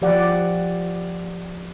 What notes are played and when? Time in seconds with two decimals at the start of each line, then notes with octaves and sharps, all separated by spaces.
0.02 F3 G4 D5 F#5